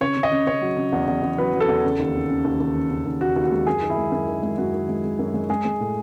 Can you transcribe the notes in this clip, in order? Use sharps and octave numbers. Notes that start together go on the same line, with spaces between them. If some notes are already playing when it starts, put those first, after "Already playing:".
C#3 C#5
C#3
D#5
C#3
C#3 C#5
F#3
C#3
E2
E2
E2
F#3 B4
F#3
A4
E2
C#3
D#2
C#3
C#3
D#2
D#2
C#3
C#3
D#2
D#2 F#4
D#2
F#4
G#3
F#2 G#4
D#3
E4
G#3
F#2
D#3
G#3
F#2 F#4
D#3
G#3
G#3
F#2
G#3
G#3 G#4
G#3
A2